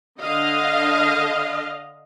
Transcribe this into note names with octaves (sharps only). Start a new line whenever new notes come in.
D3 D#5 F5